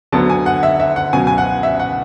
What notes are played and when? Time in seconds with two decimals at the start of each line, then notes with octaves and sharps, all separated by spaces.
0.12 D2 D3 F#3 B3 A5
0.30 G#5
0.46 F#5
0.63 E5
0.80 E5
0.96 F#5
1.13 C#2 B2 F#3 G#5
1.27 G#5
1.38 F#5
1.63 E5
1.79 F#5